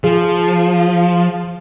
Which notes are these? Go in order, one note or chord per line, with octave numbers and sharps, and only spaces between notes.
F3 G#4